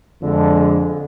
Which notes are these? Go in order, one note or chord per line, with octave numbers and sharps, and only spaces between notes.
F2 D3 G#3